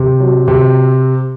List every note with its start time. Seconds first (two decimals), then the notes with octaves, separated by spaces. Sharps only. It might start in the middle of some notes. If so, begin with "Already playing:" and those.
Already playing: C3
0.20 F#3
0.48 C3